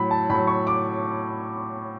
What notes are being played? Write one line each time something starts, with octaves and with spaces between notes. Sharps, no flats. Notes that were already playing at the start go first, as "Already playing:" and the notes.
Already playing: A2 F#3 B5
A5
A2 F#3 B5
C#6
D6